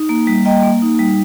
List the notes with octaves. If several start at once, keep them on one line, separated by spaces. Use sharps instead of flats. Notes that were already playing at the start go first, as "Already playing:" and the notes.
Already playing: D#4
A#3
G3
A#3 D#5 G5
A#3
D#4
G3